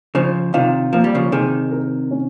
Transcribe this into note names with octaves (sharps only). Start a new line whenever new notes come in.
C#3 F3 C5
C3 D#3 F4
F3 A#3
G3
C#3 F3
C3 D#3 G#4
A#4
C#4